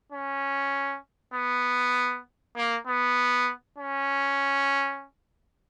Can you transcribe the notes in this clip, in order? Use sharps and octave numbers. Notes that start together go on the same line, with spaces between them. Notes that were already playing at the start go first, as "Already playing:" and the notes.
C#4
B3
A#3
B3
C#4